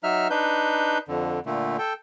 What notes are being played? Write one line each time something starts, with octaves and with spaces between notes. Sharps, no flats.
F#3 D#4 E5 F6
D4 D#4 B4 G6
F2 D3
A#2 D3 A3
A4 G5